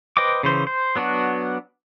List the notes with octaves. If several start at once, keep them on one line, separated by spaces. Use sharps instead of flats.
B4 C5 D#5 G5 D6
C#3 E3 C5
C5
F#3 B3 D4 F#4